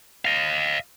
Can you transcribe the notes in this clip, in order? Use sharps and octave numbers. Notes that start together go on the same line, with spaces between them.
D#5 F5